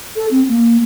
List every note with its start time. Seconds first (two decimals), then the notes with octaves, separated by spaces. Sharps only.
0.16 A4
0.31 C4
0.49 A#3